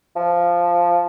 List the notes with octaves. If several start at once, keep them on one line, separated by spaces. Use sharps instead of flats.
F3